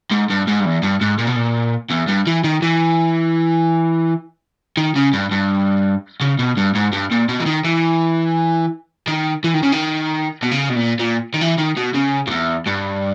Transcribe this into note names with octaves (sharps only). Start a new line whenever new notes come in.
G#2
G2
G#2
G2
E2
G2
G#2
A#2
B2
A#2
E2
G2
E3
D#3
E3
D#3
C#3
G2
G2
C#3
B2
G2
G#2
G2
A#2
B2
E3
D#3
E3
D#3
E3
D#3
C#3
D#3
B2
C#3
B2
A#2
A#2
D#3
E3
D#3
B2
C#3
G2
E2
G2